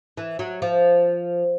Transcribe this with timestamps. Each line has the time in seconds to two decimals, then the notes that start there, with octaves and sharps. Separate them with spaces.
0.17 E3
0.39 F#3
0.62 F3